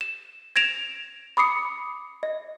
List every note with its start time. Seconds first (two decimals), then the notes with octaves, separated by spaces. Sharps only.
0.01 E7
0.56 G#6 A#6 D7 E7 F7
1.37 B5 D6 D#6 C7 C#7
2.23 D#5